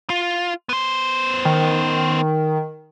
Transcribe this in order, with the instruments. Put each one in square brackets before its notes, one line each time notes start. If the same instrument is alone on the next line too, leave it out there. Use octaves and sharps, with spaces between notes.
[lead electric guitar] F4
B3 C5
[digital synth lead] D#3